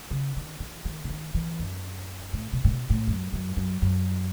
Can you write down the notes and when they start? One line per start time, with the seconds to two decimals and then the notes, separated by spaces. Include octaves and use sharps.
0.11 C#3
0.36 D#3
0.60 E3
0.85 D#3
1.04 C#3
1.10 D#3
1.34 E3
1.59 F#2
2.33 A2
2.53 B2
2.64 A2
2.70 B2
2.90 A2
3.07 F#2
3.32 F#2
3.57 F#2
3.82 F#2